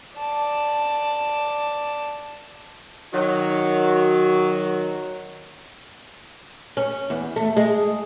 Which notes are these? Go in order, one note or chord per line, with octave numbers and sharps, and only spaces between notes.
D5 A5
D#3 F#3
C#4
E2
A3
G#3